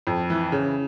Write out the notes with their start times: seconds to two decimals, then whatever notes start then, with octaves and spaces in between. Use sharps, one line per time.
0.07 F2
0.30 E3
0.52 C#3